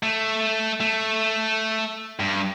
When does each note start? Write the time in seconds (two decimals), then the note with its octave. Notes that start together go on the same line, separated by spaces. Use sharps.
0.03 A3
0.80 A3
2.20 G2